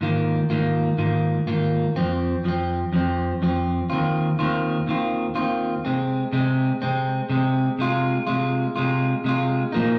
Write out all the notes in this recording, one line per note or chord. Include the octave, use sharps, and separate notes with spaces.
G#2 D#3 A#3 F4
G#2 D#3 A#3 F4
G#2 D#3 A#3 F4
G#2 D#3 A#3 F4
F2 F3 C4
F2 F3 C4
F2 F3 C4
F2 F3 C4
D#2 D#3 C4 F4
D#2 D#3 C4 F4
D#2 D#3 C4 F4
D#2 D#3 C4 F4
C3 G#3 C4
C3 G#3 C4
C3 G#3 C4
C3 G#3 C4
C3 G#3 F4
C3 G#3 F4
C3 G#3 F4
C3 G#3 F4
A#2 F3 A#3 D#4